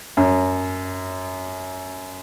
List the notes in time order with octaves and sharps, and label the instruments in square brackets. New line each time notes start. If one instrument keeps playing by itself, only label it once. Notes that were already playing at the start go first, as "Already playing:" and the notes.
[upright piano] F#2